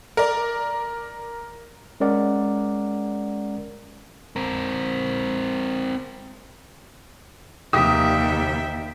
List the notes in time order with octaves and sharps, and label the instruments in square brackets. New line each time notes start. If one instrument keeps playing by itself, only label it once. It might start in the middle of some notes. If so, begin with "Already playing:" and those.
[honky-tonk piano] A#4 D5
[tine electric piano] G#3 C#4 A#4 D5 F#5
[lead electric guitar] C4 A#4
[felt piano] F1 G4 [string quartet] D#2 [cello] E5 G5 [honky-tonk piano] D#6